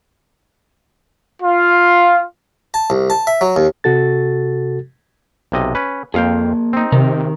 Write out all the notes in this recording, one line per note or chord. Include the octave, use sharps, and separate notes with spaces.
F4
A5
C2
A5
E5
F#3
D#2
C3 F#4 A4 A6
B1 C3 D#5
C#4 B4
F2 A#3 G#4 F5 G5
C4 D#4
C3 D#3 A#4 A#5